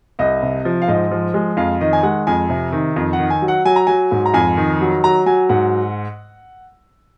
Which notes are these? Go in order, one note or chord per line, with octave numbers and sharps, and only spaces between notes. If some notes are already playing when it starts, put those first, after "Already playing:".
C2 D#5
C3
F3
F5
G#2 D#5
F3
G#3
F2 F5
D#3 D#5
G#5
G#3 F#5
F2 G#5
C3
D#3
F2
F#5
D#3
G#5
F#3
F#5
F#3 G#5
A#5
F#3 G#5
G#2
A#5
F2 G#5
D#3
F#3
F#3 A#5
F#3 G#5
G#2 F#5